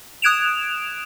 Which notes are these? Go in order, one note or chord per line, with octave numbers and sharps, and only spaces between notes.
D#6 F#6 G#6 D7 E7 F7